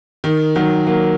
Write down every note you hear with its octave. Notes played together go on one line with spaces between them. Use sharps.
D#3
D#3 F#3
F#3 A#3